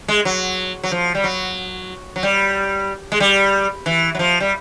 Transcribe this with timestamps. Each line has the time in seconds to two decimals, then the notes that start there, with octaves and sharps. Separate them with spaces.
0.08 G#3
0.25 F#3
0.83 F#3
0.91 F3
1.15 G3
1.24 F#3
2.16 F#3
2.23 G3
3.12 G#3
3.20 G3
3.86 E3
4.15 F#3
4.19 F3
4.40 G3